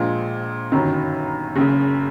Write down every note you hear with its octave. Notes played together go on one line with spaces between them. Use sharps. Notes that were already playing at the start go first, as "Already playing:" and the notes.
Already playing: A#1 A#2 F3 G#3
G1 F#2 D#3 F#3
F#1 F#2 C#3